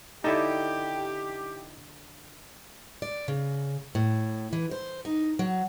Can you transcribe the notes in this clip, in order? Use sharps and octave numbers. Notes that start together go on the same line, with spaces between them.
D3 D#4 E4 G4 A4
D5
C#3
A2
E3
C5
D#4
F#3